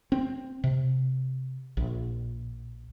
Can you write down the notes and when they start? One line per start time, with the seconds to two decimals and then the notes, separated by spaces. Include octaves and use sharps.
0.12 C4
0.64 C3
1.77 A#1